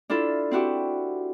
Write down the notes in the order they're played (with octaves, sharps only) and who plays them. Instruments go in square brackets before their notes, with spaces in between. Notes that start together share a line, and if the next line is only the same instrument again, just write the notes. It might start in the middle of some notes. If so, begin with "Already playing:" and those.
[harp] D4 E4 F4 A4
C4 E4 F#4 G4